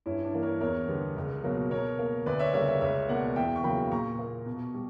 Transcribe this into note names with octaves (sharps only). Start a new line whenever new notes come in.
G2 C#4 E4
D4
E3 A#3
A#4 C#5
E2 A#4 C#5
D3 G3 B3
C#2
B2 F#3 A#3
B2 A#4 C#5
A#3
D2 B4 D5
C#5 E5
C#3 G3 A#3 C#5 E5
C#5 E5
C#2 C#5 E5
B2 A#3 D5 F#5
E2 E5 G5
C#6
C#3 F#3 A#3 G5 B5
A#2 A#5 C#6
A#3
B2
G3